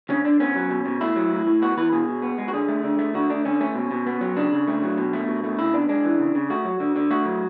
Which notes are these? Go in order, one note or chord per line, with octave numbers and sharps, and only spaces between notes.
D3 C#4
D3 D4
B3 C#4
F#3
B2
B2
A3 E4
F#3
A2
A2
B3 F#4
E3 B4
B2 G#4
B2
B3
G#3
F#4
D3 G#4
A3
D3
A3
D3 F#4
A3 D4
D3 C#4
A3 C#4
B2
B2
B3
F#3
C#3 D4
C#3
A3
F#3
B2
A3
B2
A3
C#3 E4
B3 D4
G#3 D4
E3
C#3
C#3
A3 F#4
F#3
D3
D3
A3 F#4
F#3